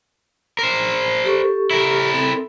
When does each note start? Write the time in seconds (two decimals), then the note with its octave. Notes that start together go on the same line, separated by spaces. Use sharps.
0.59 A#4 C5
1.24 G4 A4 C#6
1.71 E4 A#4
2.14 C4 A4